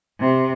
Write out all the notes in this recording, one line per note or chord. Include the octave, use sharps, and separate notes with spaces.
C3